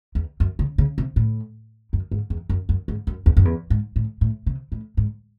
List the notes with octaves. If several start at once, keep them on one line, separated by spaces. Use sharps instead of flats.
E2
F#2
C#3
C#3
C3
A2
F#2
G#2
E2
F#2
F#2
G#2
F#2
E2
F#2
E2
G#2
A2
A2
C3
A2
G#2